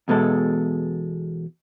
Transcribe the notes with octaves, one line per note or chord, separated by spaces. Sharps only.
E2 B2 G#3 A4